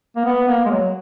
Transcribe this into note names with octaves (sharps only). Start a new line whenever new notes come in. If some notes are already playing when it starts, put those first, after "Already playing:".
A#3
B3
A#3
G#3
F#3